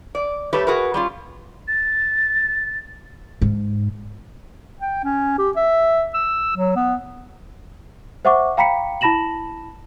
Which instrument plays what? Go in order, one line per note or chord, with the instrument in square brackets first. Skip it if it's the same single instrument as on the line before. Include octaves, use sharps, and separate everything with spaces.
[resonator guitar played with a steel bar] D5
G3 A3 G4 A4 B4 C#5
F#4 G#4 A#4 B4
G3 C#4 F4
[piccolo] A6
[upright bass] G#2
[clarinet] G5
C#4
G4
E5
E6
F#3
B3
[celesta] C5 E5 F#5 C#6 D6
F5 G5 A#5 B5 B6 C#7
E4 A5 B5 A#6 E7 F#7